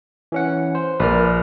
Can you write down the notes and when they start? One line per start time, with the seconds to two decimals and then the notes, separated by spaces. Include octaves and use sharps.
0.32 E3 C#4 F#5
0.75 C5
1.00 A#1 A#4 B4 D5 F6